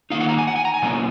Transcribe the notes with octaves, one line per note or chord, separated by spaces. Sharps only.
D#3 A#3 D#4 F5
F#5
A#5
G#5
F#5
G#5
A#5
G#5
B2 F#3 A#3 C#4